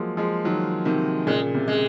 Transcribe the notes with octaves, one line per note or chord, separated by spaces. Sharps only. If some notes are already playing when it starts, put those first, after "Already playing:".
Already playing: F3 F#3 G#3 A#3
F3 G#3
D#3 F#3
C3 D#3
A#2 C#3 G#3
C3
G#3